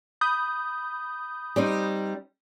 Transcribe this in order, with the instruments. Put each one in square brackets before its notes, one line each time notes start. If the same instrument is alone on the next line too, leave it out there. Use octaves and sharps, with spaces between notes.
[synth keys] B5 D#6 G6
[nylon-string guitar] G3 C4 D#4